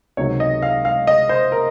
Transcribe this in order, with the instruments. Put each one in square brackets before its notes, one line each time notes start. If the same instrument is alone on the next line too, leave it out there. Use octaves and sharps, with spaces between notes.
[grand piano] C#2 C3 D#3 F#3 C#5
D#5
F5
F5
D#5
C5
A#4